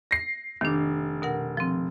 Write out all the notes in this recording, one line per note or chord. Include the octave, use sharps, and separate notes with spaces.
A#6 C7
F1 D#3 D4
B2 A#4 F#5
F3 C4